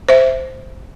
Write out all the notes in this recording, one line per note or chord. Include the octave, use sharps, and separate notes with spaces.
C5 E5